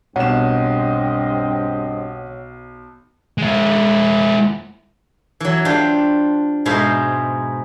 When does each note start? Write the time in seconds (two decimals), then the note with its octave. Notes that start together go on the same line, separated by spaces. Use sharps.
0.16 B1 G2 C4 C#5 D#5 F#5 E7
3.38 G#3 E4
5.40 E3 F#3
5.65 D4 F4 G4 C5
6.66 G#2 B2 G#3 C5 E5 F5